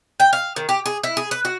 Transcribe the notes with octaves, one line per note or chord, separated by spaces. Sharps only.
G5
F5
D#3
G4
G#4
E4
G#4
B4
F#4